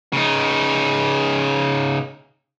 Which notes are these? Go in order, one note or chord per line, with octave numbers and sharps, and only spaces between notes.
C#3 D#4